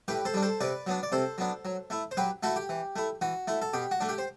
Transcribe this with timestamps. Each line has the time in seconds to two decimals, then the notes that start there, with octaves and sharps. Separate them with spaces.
0.08 A2 G4 B4
0.25 A4 C5
0.34 G3 D4
0.42 A4 C5
0.61 C3 B4 D5
0.87 F#3 B3 D4
1.03 D5
1.12 C3 A4 C5
1.38 F#3 B3 D4
1.65 F#3
1.90 A3 E4
2.11 C5
2.17 F#3 G4 B4
2.43 A3 E4 F#4 A4
2.56 G4
2.69 E3
2.96 A3 E4
3.21 E3 F#4
3.47 A3 E4
3.62 A4
3.73 B2 G4
3.91 F#4
4.00 A3 D4
4.09 G4
4.18 C5